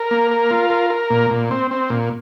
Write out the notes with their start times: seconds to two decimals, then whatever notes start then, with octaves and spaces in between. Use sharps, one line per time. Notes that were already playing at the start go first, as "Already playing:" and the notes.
Already playing: A#4
0.11 A#3
0.31 A#4
0.51 F4
0.70 A#4
0.90 A#4
1.10 A#2
1.31 A#2
1.51 C4
1.71 C4
1.90 A#2